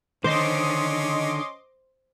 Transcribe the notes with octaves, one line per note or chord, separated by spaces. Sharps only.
D3 D#3 C#4 C5 D#5 C6 D6